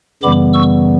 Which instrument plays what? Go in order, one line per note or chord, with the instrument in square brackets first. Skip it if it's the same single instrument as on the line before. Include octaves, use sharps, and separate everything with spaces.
[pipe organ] F#2 C#3 E3 G3 B3 B5 D6
C#6 E6